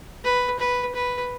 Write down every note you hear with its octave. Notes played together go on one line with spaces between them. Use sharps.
B4
B4
B4